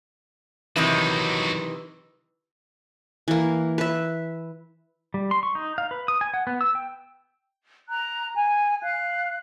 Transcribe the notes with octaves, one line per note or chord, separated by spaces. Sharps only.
C3 D#3 E3 F#3 D#4
E3 A#3
B4 E5
G3
C6
C#6
D#4
F5
B4
D#6
G#5
F#5
B3
E6
G5
A#5 F#6
G#5
F5 F#6